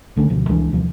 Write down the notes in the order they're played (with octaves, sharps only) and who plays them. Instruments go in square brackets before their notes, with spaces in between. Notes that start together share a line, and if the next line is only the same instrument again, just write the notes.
[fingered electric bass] C2 D3 A3 C#4
D2 B2 F3
C#2 E3 G#3 D4
D#2 C3 F3